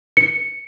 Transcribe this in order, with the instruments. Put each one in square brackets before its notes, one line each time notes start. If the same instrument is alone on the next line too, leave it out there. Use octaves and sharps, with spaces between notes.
[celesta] C#7